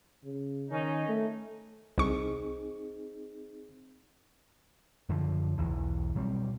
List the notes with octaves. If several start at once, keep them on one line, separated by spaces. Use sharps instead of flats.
C#3
D#3 C#4 D#4
A3
C2 C4 D#4 G#4 C#6
F#2 D3 F3
B1 E2 E3
B2 F#3 G3 C4